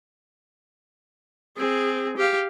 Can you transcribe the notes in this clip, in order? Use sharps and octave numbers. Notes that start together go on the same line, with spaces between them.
C4 G#4
G4 F5